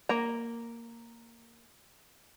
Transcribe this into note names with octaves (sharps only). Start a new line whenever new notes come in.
A#3 A#5